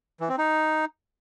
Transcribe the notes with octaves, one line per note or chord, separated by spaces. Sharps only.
E3
C4
D#4